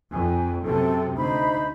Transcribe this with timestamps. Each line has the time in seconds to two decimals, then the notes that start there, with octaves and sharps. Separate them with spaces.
0.12 F2 G#5
0.63 F#2 C3 A4
1.16 D2 D#4 C5 B5